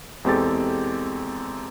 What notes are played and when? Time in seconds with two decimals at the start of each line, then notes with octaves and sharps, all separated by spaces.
0.25 E2 G#3 C4 G4 A4 A6